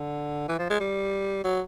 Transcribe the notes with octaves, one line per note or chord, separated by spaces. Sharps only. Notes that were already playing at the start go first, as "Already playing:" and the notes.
Already playing: D3
E3
F3
G#3
G3
F#3